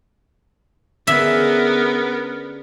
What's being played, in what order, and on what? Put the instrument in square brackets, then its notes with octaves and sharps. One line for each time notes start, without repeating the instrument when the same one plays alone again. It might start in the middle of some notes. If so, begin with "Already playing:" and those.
[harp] D3 C#4 G#4 [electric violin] B3 A#4 [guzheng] E5